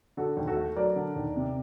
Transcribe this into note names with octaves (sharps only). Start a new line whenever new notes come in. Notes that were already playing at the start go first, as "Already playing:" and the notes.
D3 F#4 A4
D#2
F#4 A4
A3
F#3 A#4 D5
D3
D#2
C3